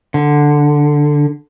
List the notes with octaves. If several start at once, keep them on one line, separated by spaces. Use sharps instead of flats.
D3